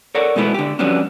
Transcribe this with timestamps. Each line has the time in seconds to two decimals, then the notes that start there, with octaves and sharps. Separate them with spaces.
0.15 A4 A#4 C#5 D5 F#5
0.36 B2 G#3 A3 B3 E4
0.54 D3 G4
0.79 F2 F#3 G3 B3 C#4 D4